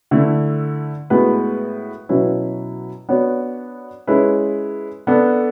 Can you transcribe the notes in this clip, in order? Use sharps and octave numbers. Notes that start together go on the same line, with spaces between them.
D3 A3 E4
A2 G#3 B3 F#4 B4
B2 F#3 C#4 E4 B4
B3 D4 F#4 C#5
G#3 C#4 E4 B4
B3 D4 A4